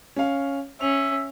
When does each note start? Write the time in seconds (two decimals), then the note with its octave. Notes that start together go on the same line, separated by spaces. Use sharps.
0.16 C#4 F5
0.81 C#4 E5 F7